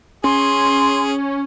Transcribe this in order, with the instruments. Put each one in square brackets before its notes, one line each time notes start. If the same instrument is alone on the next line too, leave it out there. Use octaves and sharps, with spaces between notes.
[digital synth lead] C#4 [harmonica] G#4 [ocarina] C6